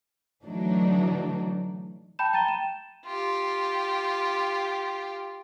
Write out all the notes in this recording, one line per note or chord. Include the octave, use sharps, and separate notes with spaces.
A2 D3 E3 F#3 D4 D#4
G5 A5 B5 G6 E7
G5 A#5 A6 D#7 E7 G7
E7
F4 G4